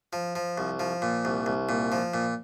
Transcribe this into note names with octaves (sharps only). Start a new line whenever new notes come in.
F3
F3
C2
F3
A#2
C2
C2
A#2
F3
A#2